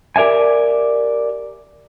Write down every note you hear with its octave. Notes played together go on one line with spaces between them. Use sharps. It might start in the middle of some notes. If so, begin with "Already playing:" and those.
G4 A#4 D5 E5 G#5